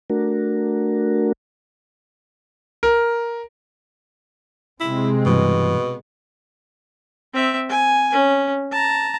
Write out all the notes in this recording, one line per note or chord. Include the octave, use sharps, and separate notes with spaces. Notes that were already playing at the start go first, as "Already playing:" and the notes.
A3 D4 F#4 A#4
A#4
C3 G#3 C4 E4
G2 B2 E3 G3
C4 E5
G#5
C#4
A5 A#5